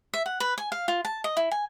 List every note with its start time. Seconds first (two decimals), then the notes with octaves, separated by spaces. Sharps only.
0.14 E5
0.26 F#5
0.40 B4
0.58 G#5
0.72 F5
0.88 F4
1.05 A5
1.24 D#5
1.37 E4
1.51 G#5